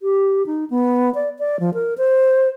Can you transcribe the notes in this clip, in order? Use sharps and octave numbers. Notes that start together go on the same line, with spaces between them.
G4
D#4
B3
D5
D5
F3
A#4
C5